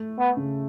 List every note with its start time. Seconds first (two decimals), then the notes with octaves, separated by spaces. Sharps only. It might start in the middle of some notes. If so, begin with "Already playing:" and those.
Already playing: A3
0.19 B3
0.37 C#3